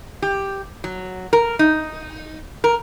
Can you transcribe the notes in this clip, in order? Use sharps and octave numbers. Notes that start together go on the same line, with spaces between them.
G4
F#3
A#4
D#4
A#4